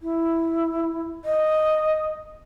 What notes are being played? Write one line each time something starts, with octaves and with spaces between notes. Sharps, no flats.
E4
D#5